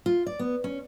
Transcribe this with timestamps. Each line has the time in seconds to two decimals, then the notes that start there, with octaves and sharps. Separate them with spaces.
0.06 F4
0.26 D5
0.39 B3
0.64 C#4